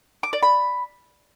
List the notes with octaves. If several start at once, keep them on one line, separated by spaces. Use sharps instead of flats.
D6
D5
B5